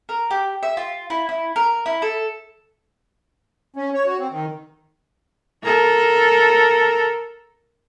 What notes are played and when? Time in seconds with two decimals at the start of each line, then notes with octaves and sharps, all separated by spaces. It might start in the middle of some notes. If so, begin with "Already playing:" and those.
0.09 A#4
0.31 G4
0.63 E5
0.77 F4
1.10 E4
1.29 E4
1.56 A#4
1.86 E4
2.02 A4
3.76 C#4
3.94 C#5
4.06 F#4
4.19 C4
4.31 D#3
5.63 A4 A#4